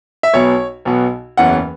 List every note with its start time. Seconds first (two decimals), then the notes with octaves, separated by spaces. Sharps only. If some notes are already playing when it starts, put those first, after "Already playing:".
0.23 E5
0.34 B1 B2 B3 C#5
0.85 B1 B2 B3
1.37 F#1 E2 E3 C#4 F#5